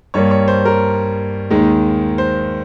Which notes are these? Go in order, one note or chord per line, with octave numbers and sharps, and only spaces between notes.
G2 G3 A#3 C#5
C#5
C5
A#4
D#2 D#3 G#3
C5